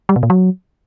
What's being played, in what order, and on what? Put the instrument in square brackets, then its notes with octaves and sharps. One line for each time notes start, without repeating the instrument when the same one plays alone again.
[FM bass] G3
B2
A#2
F#3